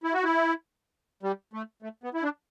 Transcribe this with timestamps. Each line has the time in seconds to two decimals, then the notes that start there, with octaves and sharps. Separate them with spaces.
0.03 E4
0.14 F#4
0.24 E4
1.23 G3
1.53 A3
1.82 A3
2.03 B3
2.14 E4
2.23 D4